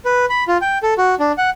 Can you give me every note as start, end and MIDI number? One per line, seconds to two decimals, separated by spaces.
0.05 0.26 71
0.30 0.44 83
0.48 0.57 65
0.61 0.78 79
0.83 0.94 69
0.98 1.15 66
1.19 1.32 62
1.38 1.50 78